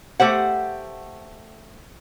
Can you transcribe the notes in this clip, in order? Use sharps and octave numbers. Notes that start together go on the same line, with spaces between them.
A3 G4 C5 F#5